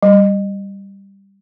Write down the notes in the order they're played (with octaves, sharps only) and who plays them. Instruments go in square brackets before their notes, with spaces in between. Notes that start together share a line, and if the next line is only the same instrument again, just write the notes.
[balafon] G3